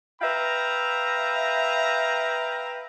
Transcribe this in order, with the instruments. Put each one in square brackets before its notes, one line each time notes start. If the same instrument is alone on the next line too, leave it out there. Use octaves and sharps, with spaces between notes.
[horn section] B4 E5 F5 G5 A#5